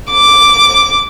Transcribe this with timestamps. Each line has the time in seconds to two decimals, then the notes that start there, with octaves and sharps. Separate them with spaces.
0.11 D6